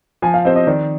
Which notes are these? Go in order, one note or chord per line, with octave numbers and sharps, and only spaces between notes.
F3 G#5
F5
C4 G4 C5 D#5
D#5
D#3 D5